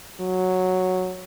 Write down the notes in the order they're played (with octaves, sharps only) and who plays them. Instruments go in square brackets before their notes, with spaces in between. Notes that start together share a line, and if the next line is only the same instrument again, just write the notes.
[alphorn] F#3